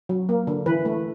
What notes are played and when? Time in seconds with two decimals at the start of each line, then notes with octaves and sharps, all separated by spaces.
0.09 F#3
0.29 A#3
0.47 D3
0.66 E3 B4
0.85 A3